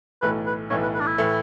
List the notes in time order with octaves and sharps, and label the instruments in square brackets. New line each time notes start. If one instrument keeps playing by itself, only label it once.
[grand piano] B1 A2 E3 A3 [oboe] B4
[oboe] B4
[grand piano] B1 A2 E3 A3 [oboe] C#5
[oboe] B4
B4
D4
E4
[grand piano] A2 E3 A3